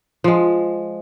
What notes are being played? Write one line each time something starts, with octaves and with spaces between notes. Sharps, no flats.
F3 G#3